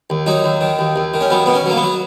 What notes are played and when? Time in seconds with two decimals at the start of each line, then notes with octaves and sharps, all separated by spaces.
0.10 D#2
0.26 F#3 D#4
0.44 D#2
0.61 D#3
0.79 D#2
0.96 D#2
1.14 D#3
1.21 C#4
1.30 F#3 B3
1.46 B2 B3
1.54 C#4
1.66 F#3 A#3
1.77 B3
1.82 F#3